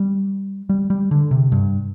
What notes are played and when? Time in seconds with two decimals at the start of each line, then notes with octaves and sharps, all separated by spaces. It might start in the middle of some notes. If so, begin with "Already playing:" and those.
Already playing: G3
0.69 G3
0.90 G3
1.11 D3
1.31 C3
1.52 G2